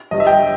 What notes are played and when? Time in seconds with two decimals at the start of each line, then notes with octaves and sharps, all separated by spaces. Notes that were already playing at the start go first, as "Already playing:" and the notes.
0.11 G1 G2 G3 D#5
0.20 E5
0.27 G5